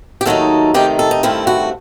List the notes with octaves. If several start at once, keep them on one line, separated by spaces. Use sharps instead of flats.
G4
D#2 D#3 F#3 A3 D#4 A4
C3 D#3 A3 D#4 G4
A4
D#4
G2 D#3 A3 C4 E4
F#4